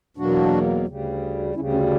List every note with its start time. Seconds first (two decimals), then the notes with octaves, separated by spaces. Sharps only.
0.17 E2 B2 F#3 A#3 D4 F#4
0.87 D2 C#3 G3
1.55 D2 C#3 G3 C#4 E4
1.73 C#4